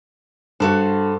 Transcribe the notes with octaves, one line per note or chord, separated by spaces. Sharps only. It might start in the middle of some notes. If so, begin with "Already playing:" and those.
G2 F#4 A4 C5